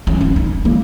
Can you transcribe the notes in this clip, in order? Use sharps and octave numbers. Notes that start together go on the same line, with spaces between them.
C#4
C#4
D#4
A#3